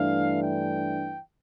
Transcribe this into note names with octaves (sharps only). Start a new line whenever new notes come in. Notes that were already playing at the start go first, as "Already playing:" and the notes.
Already playing: G2 E3 A3 D4 F5
G5